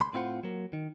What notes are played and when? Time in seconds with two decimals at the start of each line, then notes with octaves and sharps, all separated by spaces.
0.01 C#2 B5 C6
0.13 A2 C4 E4 F4 C5 F#5
0.43 F#3 A#3
0.73 D#3